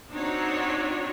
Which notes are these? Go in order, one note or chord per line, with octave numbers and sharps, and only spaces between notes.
C4 D4 D#4 F#4 C#5